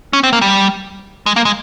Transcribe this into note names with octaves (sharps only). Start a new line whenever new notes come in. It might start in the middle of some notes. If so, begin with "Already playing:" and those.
C#4
C4
A#3
G3
G#3
A#3
G#3